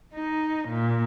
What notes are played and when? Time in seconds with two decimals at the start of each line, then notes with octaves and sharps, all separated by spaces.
0.13 D#4
0.69 A#2